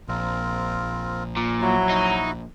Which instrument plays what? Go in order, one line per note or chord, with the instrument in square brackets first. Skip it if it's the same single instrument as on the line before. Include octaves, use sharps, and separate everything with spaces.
[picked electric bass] A#1 [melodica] C4 F4 A#4
[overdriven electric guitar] A#2
[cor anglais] F#3 [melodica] E4 F#4
[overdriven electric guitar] D#4